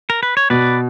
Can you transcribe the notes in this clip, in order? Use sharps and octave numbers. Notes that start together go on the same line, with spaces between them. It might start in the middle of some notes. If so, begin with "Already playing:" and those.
A#4
B4
C#5
B2 B4 D5